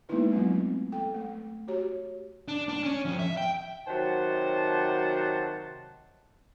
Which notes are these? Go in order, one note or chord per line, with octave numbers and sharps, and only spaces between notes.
G#3 A#3 B3 D#4 E4 B4
F#3 A3 B3 C4 F4
A4 G5
A3
F#4 G4 C#5
D4
D4
C#4
F2
E5
G5
C3 D#3 F#3 C5 F#5 A5